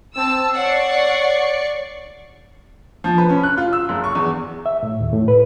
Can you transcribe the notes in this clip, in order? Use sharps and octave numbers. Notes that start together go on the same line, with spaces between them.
C4 A5 E6
C#5 D5 F#5 C#6 C7
F3
B4
C#4
F#6
F4
E6
F#1
C#6
E2
E5
A2
D#2
A2
B4